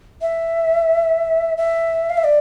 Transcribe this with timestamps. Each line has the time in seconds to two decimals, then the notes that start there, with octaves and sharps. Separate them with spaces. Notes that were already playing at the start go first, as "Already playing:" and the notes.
0.21 E5
1.57 E5
2.10 F5
2.17 E5
2.24 D5